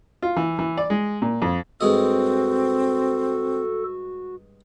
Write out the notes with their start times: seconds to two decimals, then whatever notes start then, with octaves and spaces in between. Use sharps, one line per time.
0.22 F4
0.36 E3
0.59 E3
0.77 D5
0.90 G#3
1.22 A#2
1.42 F2
1.81 G2 G#3 C4 F#4 A4 D#5